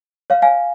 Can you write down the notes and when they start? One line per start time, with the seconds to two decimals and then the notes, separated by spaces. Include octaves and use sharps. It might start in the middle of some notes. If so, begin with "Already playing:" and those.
0.30 C#5 F5
0.42 F5 G#5